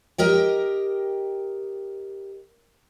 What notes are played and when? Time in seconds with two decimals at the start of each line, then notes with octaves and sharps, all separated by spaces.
0.18 G4 A#4 D#5 G5